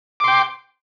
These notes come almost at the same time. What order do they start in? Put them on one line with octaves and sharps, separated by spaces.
D6 C6 G5